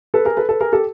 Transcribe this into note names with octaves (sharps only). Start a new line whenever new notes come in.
A4 B4
G#4 A#4
A4 B4
A4 B4
G#4 A#4
G4 A4